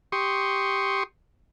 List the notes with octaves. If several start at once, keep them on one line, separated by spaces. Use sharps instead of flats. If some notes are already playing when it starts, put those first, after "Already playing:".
G4 C6 C#6 D#6